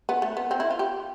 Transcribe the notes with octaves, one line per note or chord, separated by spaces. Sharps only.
B3
A3
B3
C4
E4
F4
G4